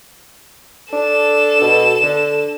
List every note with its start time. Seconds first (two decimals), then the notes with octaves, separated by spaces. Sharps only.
0.93 D4 A4 E7
1.62 B2
2.03 D3